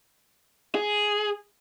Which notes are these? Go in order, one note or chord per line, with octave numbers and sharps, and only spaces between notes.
G#4